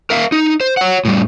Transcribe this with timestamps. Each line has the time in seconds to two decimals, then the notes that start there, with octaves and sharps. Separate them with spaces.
0.10 A#4 E5 F5
0.32 D#4
0.60 C5
0.77 C#5 F#5
1.05 A2 G3